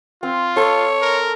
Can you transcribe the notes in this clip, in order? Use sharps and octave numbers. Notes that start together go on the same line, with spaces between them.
C4 F4
A4 C#5
A#4